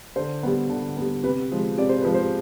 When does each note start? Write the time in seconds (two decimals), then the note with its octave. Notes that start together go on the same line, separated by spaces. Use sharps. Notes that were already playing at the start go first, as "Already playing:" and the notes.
0.16 D3 C5
0.43 G3 B3
0.69 D3
0.97 G3 B3
1.23 C3 B4
1.52 F3 G#3
1.78 C3 D5
1.89 C5
2.02 F3 G#3 B4
2.14 C5